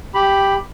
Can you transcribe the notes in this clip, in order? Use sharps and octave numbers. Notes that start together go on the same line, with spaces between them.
G4 B5